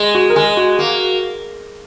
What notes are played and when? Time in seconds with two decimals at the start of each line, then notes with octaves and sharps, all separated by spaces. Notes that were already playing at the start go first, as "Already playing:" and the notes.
Already playing: G#3
0.15 F#4
0.30 A#4
0.36 G#3 G#4
0.57 F#4
0.79 A#3